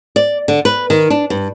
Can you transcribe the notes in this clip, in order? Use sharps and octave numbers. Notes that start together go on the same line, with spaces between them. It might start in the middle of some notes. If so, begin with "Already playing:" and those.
D5
D3
B4
D#3
D4
G2